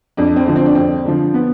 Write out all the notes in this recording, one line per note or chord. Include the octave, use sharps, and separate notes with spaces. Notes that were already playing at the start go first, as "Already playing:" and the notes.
F2 D4
C4
D3 F3
C4
D4
F2 C4
D3 F3
B3